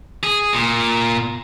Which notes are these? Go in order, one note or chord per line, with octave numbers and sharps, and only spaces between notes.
G#4
A#2